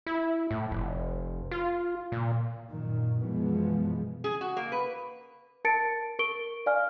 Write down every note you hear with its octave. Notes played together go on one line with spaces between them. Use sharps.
E4
A2
F1
F4
A#2
F#2 A#2 D#3
F#2 B2 E3 F3 G#3 B3
G#4
F#4
A#3
B4
A#4 A5 A6 C#7 D7
A#4 C#6 D7 G7
D5 F5 G#5 F6